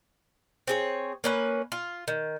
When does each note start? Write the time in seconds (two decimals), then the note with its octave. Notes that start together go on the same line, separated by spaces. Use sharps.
0.68 C4 G#4 C#5
1.24 A#3 C#4 B4
1.72 F4
2.08 D#3